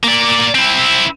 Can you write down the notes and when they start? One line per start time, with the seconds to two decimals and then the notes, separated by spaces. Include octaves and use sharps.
0.04 A#3 D5
0.55 C4 E4